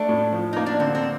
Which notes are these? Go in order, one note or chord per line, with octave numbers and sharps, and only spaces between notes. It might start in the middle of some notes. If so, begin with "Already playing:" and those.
Already playing: A3 D4
A2
F3
A#3 D#4
D4
D3 C4
C4